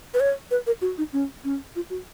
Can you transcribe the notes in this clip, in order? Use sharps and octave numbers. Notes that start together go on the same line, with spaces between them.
B4
C#5
B4
A#4
F#4
D#4
C#4
C#4
F4
F#4